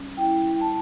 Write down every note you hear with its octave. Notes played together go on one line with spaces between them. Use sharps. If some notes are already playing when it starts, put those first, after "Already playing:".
Already playing: G3 C#4
E4 G5
E4 A5